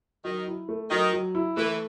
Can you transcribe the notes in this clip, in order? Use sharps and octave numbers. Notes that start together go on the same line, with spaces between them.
D#3 F#3
E4
A3
D#3 F#3
F#3
E4
E3 A3